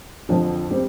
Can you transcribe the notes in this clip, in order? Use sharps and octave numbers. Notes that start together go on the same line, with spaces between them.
F2 D3 F3
G3 C4 G4